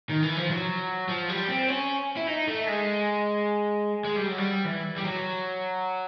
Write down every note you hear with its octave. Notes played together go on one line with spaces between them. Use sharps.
D#3
E3
F3
F#3
F3
G3
C4
C#4
E4
D#4
A3
G#3
G#3
G3
F#3
G3
E3
G3
F#3